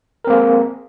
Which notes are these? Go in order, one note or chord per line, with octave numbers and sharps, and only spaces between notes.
A#3 C4 G#4 A#4